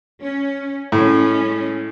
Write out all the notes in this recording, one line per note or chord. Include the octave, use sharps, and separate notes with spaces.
C#4
A2 G#3 C#4